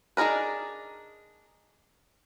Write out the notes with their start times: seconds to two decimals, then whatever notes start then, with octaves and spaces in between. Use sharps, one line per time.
0.17 D4 D#4 G#4 A#4 B4